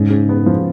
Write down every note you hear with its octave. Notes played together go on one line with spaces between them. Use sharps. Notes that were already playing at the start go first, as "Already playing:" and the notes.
Already playing: G#2 C#3
C#3
B3
F3